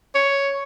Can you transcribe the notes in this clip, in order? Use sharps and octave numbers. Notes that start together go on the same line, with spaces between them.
C#5